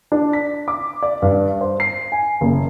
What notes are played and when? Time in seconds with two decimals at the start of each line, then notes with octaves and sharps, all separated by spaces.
0.12 D4
0.33 B6
0.68 D6
1.03 D5
1.22 G2
1.61 C5
1.80 C7
2.12 G#5
2.41 F#1